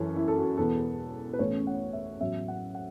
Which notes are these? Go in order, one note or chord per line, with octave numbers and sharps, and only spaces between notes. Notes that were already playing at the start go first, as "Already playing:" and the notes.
Already playing: F#2 E3 C#4 A4
E4
A4
F#4
E1 E2 E3 B3 A4
B4
A1 A2 A3 C#4 C#5
F#5
E5
A1 A2 F#3 B3 E5
F#5
F#5